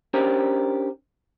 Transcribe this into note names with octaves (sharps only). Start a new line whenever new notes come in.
C#4 D4 G4 A#4 C5 C#5